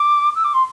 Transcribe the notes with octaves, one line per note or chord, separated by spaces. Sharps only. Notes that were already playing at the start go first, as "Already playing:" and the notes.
Already playing: D6
E6
D6
C6